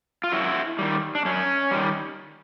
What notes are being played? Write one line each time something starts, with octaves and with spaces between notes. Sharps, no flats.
F4
F#2 E4 F#4
D#3 G3
D4
F#2 C#4
D#3 G3